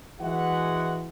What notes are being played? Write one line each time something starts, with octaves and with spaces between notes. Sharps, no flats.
E3 G#3 F#4 E5 F#5